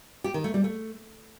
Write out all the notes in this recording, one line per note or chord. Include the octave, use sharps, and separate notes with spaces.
G4
D#3
A3
G3
A3